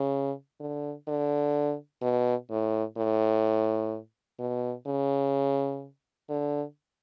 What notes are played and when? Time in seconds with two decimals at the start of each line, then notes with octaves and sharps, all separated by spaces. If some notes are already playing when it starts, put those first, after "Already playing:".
Already playing: C#3
0.60 D3
1.08 D3
2.02 B2
2.50 A2
2.97 A2
4.40 B2
4.87 C#3
6.29 D3